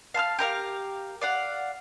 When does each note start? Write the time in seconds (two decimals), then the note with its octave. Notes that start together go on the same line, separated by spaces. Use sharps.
0.14 F5 A5 E6 F6
0.39 G4 A#4 F5
1.21 D5 F5 F#5